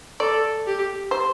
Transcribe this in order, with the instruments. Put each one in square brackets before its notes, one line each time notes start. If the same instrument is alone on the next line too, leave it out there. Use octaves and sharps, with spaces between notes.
[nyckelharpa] A4 [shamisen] D5
[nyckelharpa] G4
[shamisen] C5